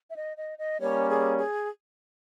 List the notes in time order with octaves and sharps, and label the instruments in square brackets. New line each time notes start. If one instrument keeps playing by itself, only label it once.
[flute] E5
D#5
D#5
D#5
[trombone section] G3 A#3 C#4 [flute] C#5
[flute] G#4
G#4